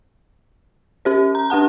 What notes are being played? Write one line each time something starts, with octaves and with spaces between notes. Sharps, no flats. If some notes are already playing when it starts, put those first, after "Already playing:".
C#4 G4 C5
A#5
D4 G4 F#5 A5